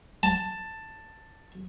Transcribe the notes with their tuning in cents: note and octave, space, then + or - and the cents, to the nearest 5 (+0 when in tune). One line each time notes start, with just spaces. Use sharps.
A5 +10